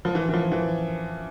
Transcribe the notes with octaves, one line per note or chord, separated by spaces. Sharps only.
F3
E3
E3
F3
E3